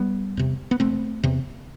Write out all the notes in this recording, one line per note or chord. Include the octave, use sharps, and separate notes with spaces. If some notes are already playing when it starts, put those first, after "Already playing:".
Already playing: G3 B3
E2 C3
B3
E1 A3 C4
E2 C3